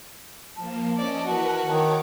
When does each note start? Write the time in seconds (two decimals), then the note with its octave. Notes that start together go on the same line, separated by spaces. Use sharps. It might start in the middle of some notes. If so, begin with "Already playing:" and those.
0.56 F3 A#3 A5
0.97 C#4 D5 D#5
1.25 E3 F#4 A#4 B4
1.64 D#3 C#5 D6